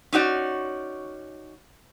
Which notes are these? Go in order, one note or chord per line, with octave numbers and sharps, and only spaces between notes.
C#4 D#4 F#4 D5